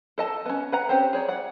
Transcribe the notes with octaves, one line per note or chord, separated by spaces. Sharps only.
A4 D#5 A5
B3 C#4
B4 F#5 A#5
C4 C#4 G4 C5
G#4 C#5 D5
D5 F#5